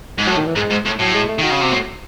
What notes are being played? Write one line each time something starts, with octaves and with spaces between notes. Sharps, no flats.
G#2
A2 F#3
D#3
E3
G#2 G#3
G#2
A2
A2 F#3
G#3
A3
D#3 F#4
C#3
C3
A2